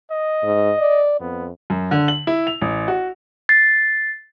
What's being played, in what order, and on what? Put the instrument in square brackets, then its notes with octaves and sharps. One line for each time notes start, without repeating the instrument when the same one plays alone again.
[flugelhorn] D#5
[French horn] G#2
D5
[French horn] F2 [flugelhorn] B3
[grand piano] F#2
D3
F#7
E4
F7
A1
F#4
[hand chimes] A6 C7